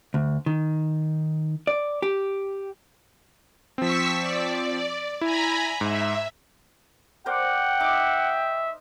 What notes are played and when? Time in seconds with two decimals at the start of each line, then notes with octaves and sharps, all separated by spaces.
0.14 D2
0.46 D#3
1.67 D5
2.02 G4
3.78 F3 C4 C#6 E6 B6
4.20 D5
5.21 E4 G#5 A#5 B5
5.81 G#2 E5
7.26 A#4 C5 D5 F#5 G5
7.80 D#4 E5 D6